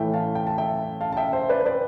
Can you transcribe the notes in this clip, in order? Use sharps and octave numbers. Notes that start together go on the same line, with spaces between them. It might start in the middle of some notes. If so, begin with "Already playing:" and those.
Already playing: A2 E3 A3 E5 G5
F5 A5
G5
A5
E5 G5
F5 A5
A5
E5 G5
C5 E5
B4 D5
B4 D5